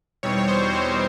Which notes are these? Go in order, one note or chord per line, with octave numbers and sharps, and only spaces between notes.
E2 B2 G3 C4 D#4 C#5
C#5
C5
E2 B2 G3 C4 D#4 C#5